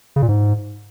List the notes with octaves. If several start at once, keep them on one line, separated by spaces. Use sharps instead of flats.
C#3
A#2
G#2